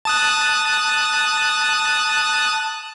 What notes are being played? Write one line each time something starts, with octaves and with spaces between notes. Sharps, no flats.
A5 D#6 F#6